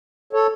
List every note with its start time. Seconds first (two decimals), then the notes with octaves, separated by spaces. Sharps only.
0.33 A4 C#5